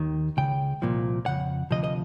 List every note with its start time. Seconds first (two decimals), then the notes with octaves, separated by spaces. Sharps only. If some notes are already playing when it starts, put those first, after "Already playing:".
Already playing: D#2 D#3
0.37 C#2 C#3 G5
0.82 C2 A#2 F3
1.26 F2 C#3 F#5
1.71 D2 C3 F3 D#5
1.84 D#5